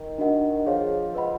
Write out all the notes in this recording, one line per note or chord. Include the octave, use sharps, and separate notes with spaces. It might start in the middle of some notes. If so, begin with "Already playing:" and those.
Already playing: D#3
D4 F#4 A#4 D#5 F#5
F3 G#4 C#5 F5
B4 D#5 F#5 B5